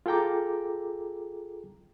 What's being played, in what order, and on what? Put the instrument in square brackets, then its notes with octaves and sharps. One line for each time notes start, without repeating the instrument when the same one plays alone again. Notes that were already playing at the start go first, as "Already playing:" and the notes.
[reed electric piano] F4 G#4 A4 G5 A#5 D6